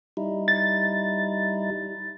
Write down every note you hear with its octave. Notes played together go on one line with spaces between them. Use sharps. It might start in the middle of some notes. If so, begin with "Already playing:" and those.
G3 D#4 E4
A6